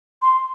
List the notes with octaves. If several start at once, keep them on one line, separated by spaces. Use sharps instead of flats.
C6